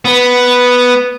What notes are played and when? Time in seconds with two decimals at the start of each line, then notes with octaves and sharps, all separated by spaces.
0.05 B3